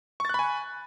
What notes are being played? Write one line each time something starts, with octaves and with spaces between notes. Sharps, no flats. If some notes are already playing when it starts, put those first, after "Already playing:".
G#5 B5 C#6 F#6 A6